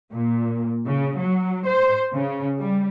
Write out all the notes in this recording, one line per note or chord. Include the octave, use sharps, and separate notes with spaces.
A#2
C#3
F#3
C5
C#3
G3